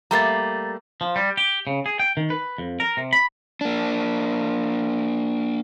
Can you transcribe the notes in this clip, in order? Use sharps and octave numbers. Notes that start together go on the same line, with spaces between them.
G3 A3 A#3 A#5 A6
F3
G3
G4
C#3
G#4
G5
D#3
B4
F2
A#4
C3
B5
A#3 D4